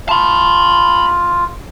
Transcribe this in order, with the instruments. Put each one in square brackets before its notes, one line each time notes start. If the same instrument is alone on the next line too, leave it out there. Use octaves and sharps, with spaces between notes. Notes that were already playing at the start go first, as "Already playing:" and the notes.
[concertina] F4 [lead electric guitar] A5 B5